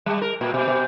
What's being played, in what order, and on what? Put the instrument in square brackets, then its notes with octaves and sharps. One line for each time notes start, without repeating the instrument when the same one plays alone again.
[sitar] G3
A#4
A#2
B2
B2